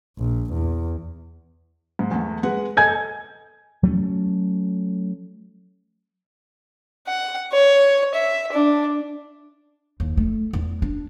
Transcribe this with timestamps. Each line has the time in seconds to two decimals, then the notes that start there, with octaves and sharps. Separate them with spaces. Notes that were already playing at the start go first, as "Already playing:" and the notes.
0.18 A#1
0.53 E2
1.99 G#2
2.11 E2 A3
2.43 G#3 B4 F#5
2.77 A4 D#5 G#5 G6 G#6
3.83 F#3 A3 C4 C#4
7.07 F#5
7.52 C#5
8.14 E5
8.52 D4
10.00 D#2
10.17 A3
10.53 E2
10.82 D4